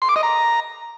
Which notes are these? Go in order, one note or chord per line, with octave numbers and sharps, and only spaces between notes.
C6
D6
D#5
A#5